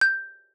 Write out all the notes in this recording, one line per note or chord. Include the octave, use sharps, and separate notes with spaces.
G6